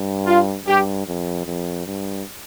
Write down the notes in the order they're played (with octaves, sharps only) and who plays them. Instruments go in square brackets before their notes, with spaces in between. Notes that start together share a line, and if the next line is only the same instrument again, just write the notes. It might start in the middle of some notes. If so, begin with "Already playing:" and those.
Already playing: [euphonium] G2
[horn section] F4
[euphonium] G2 [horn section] G4
[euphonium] F2
F2
G2